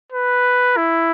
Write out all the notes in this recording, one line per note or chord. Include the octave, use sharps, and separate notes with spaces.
B4
E4